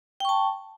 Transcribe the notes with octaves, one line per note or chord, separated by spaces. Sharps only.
G5 A5 C#6